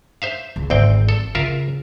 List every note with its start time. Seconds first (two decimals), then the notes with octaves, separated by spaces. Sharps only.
0.22 C5 E5 F5
0.56 C#2
0.70 G#1 D2 C4 G5
1.09 A4
1.35 C#3 F4 A#4 E5